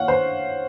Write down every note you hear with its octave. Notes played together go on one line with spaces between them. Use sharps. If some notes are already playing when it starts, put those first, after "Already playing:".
Already playing: C#5 F5 F#5
C5